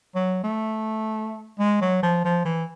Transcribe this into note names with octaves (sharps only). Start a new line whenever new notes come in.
F#3
A3
G#3
F#3
F3
F3
E3